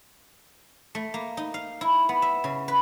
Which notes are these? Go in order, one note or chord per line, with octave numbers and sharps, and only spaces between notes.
A3
A#3
D#4
F5
E4
B3
E5
C#3
B4